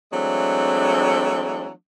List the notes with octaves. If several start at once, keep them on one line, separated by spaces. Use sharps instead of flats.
E3 F#3 G#3 A3 C4 D4